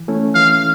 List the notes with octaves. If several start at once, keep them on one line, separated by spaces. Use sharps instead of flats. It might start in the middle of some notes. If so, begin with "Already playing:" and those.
Already playing: E3
A3 C#4 E4
E3 F5